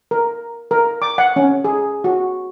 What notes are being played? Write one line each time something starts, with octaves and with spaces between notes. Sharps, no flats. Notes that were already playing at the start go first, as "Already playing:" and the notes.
A#4
A#4
D6
F#5
C#4
G#4
F#4